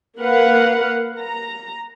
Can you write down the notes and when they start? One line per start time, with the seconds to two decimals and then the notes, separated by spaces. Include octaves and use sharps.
0.20 A#3 A#4 B4 F5 F#5
1.20 A#5